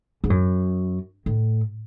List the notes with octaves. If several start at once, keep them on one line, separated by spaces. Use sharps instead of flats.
G#2
F#2
A2